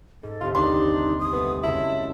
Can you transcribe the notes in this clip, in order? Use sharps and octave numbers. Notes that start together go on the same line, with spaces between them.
G#2 A4
G1 C2 F4
D#2 D4 D#4 C6
D#6
G3 A3 B3
F#2 C#3 G#3 E4 A5